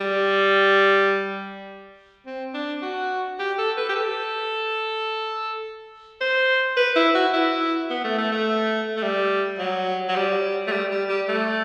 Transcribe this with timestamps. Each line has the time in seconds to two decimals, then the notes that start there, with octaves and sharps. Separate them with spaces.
0.01 G3
2.26 C4
2.54 D4
2.82 F#4
3.39 G4
3.58 A4
3.77 B4
3.89 G4
3.96 A4
6.21 C5
6.77 B4
6.96 E4
7.15 F#4
7.34 E4
7.90 B3
8.04 A3
8.18 A3
8.32 A3
8.96 A3
9.03 G3
9.59 F#3
10.09 F#3
10.16 G3
10.67 A3
10.72 G3
10.91 G3
11.09 G3
11.28 A3